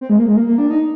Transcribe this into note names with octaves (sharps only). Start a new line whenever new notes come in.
C4
G#3
A#3
G#3
A#3
A#3
D4
D#4